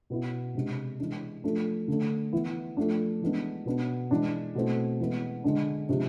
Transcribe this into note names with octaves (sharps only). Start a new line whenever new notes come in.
B2 B3 E4
C3 G#3 D4
E3 G#3 D4
F3 A3 D4
D3 A3 D4
E3 B3 E4
F3 A3 D4
E3 G#3 B3 D4
B2 B3 D4
E3 G#3 D4
B2 A3 C4 E4
E3 G#3 B3
D3 G#3 D4
C3 F3 G#3 D4